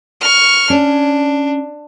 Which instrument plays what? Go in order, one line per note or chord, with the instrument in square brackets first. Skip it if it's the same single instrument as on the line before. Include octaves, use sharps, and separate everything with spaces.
[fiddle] C#6 F6
[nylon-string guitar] C#4 C#5 [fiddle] D4